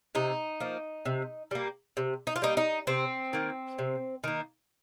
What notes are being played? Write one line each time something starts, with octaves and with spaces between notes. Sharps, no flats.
C3 D#4
F3 A#3
C3
G3 A#3
C3
D#4
F4
G3 A#3 D#4
D#4
C3 C4
D#3 A#3
C3
D#3 A#3